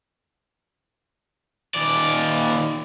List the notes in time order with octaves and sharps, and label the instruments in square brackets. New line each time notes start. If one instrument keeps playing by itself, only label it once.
[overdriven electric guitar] D#2 D5